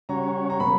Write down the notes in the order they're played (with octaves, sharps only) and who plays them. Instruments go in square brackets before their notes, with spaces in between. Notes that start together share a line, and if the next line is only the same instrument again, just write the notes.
[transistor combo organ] C#3 G3 C#4 F#4 C#5 [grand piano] A#5
[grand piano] A#5
[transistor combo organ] B2 F#3 A#3 [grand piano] B5